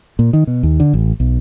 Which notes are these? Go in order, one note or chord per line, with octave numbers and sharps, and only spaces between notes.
A#2
D#3
B2
D#2
D3
A1
B1